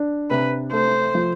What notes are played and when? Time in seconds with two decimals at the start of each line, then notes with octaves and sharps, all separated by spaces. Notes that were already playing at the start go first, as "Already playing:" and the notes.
Already playing: D4
0.30 C3 B4
0.72 A3 C5
1.15 F3